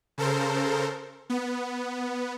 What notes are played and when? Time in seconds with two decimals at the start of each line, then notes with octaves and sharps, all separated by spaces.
0.18 C#3 A4 A#4 C5
1.30 B3